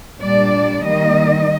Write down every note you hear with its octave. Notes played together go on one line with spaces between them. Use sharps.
A#2 G3 D4 D5
D#3 G3 A#3 D#5